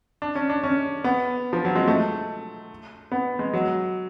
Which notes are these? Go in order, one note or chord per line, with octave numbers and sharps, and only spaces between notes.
D4
C#4
D4
C#4
B3
F3
F#3
G#3
A3
B3
G#3
F#3